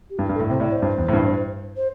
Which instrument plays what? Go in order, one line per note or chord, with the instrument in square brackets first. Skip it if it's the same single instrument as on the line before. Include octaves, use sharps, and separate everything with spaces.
[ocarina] G4
[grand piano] G2 [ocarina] E4
[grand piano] G2
[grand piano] A2 [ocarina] A4
[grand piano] C3 [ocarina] C5
[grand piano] A2 [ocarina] D5
[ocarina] C5
[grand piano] G2
E2
A2
G2
[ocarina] C5